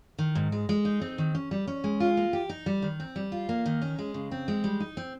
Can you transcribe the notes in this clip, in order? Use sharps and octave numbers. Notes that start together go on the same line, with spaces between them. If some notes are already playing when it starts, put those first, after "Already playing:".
D#3
G#2
G#3
G#3
D#4
C4
D#3
C#4
G3
C#4
G#3
F4
A#3
G4
D#4
G3
D#3
C4
G3
F4
A#3
D#3
C#4
G#3
C#3
C4
G#3
G3
D#4
C4